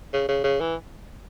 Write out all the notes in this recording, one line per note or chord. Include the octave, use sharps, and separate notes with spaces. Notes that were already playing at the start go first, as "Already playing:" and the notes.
C#3
C#3
C#3
E3